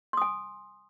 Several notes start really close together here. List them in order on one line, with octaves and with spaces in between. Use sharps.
C6 D#6 G#5